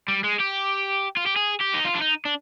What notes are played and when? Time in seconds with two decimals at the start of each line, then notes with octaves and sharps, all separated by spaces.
0.08 G3
0.24 G#3
0.40 G4
1.17 F4
1.26 G4
1.36 G#4
1.61 G4
1.74 D#4
1.85 F4
1.95 D4
2.02 D#4
2.25 D4